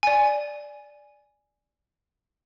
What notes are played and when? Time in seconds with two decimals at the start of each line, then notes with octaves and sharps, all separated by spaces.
0.03 D5 G#5